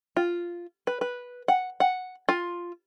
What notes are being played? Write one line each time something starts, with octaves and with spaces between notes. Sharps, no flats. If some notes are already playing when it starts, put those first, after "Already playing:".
F4
B4
B4
F#5
F#5
F4